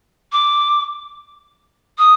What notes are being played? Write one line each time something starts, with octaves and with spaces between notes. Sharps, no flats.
D6
D#6